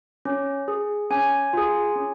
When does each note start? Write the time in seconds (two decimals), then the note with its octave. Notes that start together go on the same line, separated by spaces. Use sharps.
0.25 C#4
0.68 G#4
1.11 C#4 G#5
1.53 F4 G#4
1.96 C#4